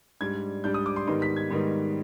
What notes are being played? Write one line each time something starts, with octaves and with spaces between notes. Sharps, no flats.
G#2 G3 D4 G#6
G#2 G3 D4 G6
D#6
D6
C6
G#2 D#3 G3 B3 D#4 C6
B6
G#6
G#2 D#3 G3 B3 D#4